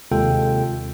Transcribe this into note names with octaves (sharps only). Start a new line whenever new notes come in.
D#2 C3 G#3 F4 A4 G5